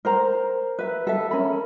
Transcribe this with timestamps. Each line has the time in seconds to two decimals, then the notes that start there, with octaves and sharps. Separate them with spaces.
0.05 A#4 C5 A#5
0.79 B4 E5
1.07 A4 E5
1.31 C#4 A#4 B5